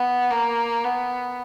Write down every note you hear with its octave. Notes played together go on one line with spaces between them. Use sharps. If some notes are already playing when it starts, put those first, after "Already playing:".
Already playing: B3
A#3
B3